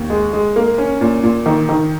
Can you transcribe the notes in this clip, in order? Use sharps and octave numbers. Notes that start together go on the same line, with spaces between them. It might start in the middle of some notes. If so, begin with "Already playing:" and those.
Already playing: D#2
G#3
G#3
A#3
C#4
A#2
A#2
D#3
D#3